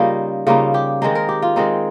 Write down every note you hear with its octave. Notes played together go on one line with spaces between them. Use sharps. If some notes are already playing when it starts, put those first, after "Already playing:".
Already playing: C#3 G3 A#3 C#4 D#4 F4
C#3 G3 A#3 D#4 F4
G4
D#3 G#3 C4 D#4 G#4
A#4
G4
F4
D#3 G#3 C4 D#4